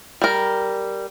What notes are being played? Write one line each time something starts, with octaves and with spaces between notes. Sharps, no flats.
G3 A#4